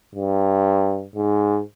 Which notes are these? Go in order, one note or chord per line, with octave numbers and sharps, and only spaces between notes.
G2
G#2